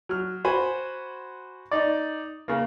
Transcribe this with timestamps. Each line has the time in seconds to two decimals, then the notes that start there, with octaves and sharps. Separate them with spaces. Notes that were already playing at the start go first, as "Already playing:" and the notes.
0.09 F#3 F6
0.45 F#4 C5 G#5 B5
1.71 D#4 D5
2.48 C#3 A#3